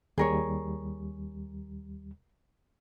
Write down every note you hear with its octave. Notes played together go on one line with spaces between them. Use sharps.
D#2 G3 G#4 A#4 C#5